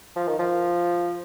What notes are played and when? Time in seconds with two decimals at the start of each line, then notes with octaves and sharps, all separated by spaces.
0.16 F3
0.28 D#3
0.39 F3